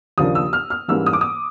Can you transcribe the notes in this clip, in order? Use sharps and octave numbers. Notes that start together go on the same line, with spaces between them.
D#2 C#3 F3 A#3 D4 D#6
E6
F6
F6
G#2 E3 G3 A#3 C#4 E6
D#6
D6
D#6